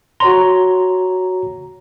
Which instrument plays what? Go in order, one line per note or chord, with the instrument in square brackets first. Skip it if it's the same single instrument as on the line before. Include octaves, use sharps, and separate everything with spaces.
[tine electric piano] F#4 C#5 A#5 [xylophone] C6